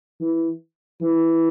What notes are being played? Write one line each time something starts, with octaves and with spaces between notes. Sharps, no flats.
E3
E3